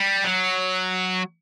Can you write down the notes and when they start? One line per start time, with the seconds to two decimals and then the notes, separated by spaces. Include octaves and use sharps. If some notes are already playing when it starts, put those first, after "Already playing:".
Already playing: G3
0.24 F#3